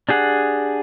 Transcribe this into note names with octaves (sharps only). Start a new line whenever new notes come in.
D4 G4 G#4 F#5